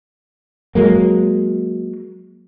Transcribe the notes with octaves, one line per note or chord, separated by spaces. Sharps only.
F#3 G#3 A#3